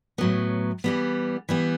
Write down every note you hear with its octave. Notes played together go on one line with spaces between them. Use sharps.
A2 F#3 B3
E3 G3 B3
E3 G3 B3